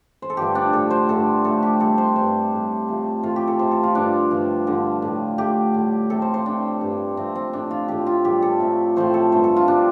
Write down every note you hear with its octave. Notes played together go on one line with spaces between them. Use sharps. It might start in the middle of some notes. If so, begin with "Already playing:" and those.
C5
A4
G2 D3 F3 A3 G4
D4
A2 A3 A4
C5
G2 D3 A3 A4
A2 F3 A3 A4
G4
C3 G3 A4
C5
G2 G3 C5
A2 G3
C3 F3 A3
A2 F3 A3 F4
G4
A4
C3 A3 C5
A4
F4
G2 D3 F3 D4
G2 F3 A3
G2 D3 F3
A2 G3
A2 A3 G4
A2 G3
C3 A3 A4
C5
C5
C3 A3 D4
G2 G3
C3 F3 A3 C4
C4
A2 A3 D4
F4
A2 F3 A3 G4
F4
A2 G3 G4
A4
C3 F3 A3
A2 F3 A3 C5
A4
G2 D3 A3 C5
A4
F4
C3 G3 D4